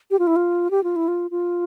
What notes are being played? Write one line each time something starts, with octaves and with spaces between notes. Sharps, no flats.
G4
F4
E4
F4
G4
F4
E4
F4
F4